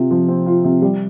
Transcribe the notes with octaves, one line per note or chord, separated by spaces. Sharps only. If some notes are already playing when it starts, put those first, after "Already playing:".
Already playing: C3 F4
F3
C4
F4
C3
G3